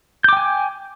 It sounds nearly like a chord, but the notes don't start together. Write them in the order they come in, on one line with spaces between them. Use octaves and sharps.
G6 D6 G5 G#5